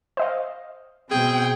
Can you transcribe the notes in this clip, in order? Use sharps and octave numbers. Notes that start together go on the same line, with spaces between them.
C5 D#5 F5
B2 C4 G#4 G5